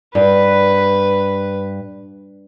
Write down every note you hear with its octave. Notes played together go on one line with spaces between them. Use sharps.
G2 B4